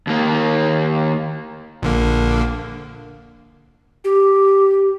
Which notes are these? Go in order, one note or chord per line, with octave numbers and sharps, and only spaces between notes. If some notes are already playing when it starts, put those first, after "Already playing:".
D#2 A#3
A#1 D3 A#3
G4